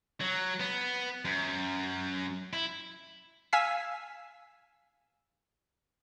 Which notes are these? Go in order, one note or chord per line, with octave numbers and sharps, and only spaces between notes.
F#3
B3
F#2
E4
F5 G#5 E6 B6